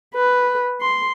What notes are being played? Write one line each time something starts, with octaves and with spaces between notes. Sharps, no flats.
B4
C6